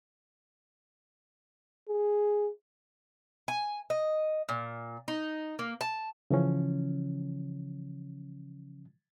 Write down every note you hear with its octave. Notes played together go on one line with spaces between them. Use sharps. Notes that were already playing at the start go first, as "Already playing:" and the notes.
G#4
G#5
D#5
A#2
D#4
A#3
A5
C#3 E3 F3 C#4